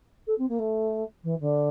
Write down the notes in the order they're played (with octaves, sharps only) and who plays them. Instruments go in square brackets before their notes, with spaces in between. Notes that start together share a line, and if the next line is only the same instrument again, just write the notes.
[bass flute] A4
C4
A#3
A3
E3
D3